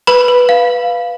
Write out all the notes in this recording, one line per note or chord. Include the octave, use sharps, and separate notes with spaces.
B4 B5
B4
F5